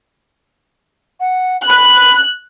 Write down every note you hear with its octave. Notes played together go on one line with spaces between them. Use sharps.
F#5
B5 F#6